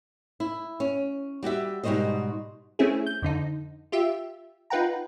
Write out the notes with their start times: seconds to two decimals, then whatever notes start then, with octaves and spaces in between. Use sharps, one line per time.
0.40 E4
0.80 C#4
1.43 G3 F#4 G4 E5
1.83 G#2 B2 G3 F#4 C5 D#5
2.79 A3 C4 C#4 E4 G#4
3.06 G6
3.22 F2 D3 D#4
3.92 F4 G4 E5
4.70 D#4 F4 B4 F#5 G5 A#5